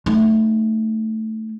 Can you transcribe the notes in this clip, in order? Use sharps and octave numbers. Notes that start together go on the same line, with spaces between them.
A3 D#4